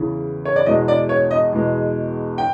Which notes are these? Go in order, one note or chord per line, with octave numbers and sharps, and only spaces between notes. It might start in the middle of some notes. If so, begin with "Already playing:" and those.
Already playing: E2 C#3 E3
C#5
D5
E2 B2 G#3 D#5
D5
C#5
D#5
E2 B2 G#3
G5